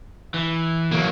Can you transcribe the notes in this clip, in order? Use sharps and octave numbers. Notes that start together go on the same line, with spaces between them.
E3
F#3 A#3